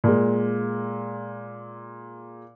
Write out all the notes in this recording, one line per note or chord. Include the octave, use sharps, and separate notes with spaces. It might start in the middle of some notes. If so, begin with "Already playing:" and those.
A#2 G#3